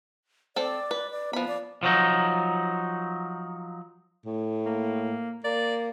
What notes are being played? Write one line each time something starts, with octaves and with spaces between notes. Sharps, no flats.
C4 A4 D5
B4
D5
F3 B3 B5
D5
F3 F#3 D#4
A2
A#3
A#3 D5